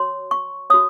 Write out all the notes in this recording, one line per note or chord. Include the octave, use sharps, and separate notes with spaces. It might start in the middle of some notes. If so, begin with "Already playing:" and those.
Already playing: F#4 C#5 C6
C#6
F#4 C#5 D#6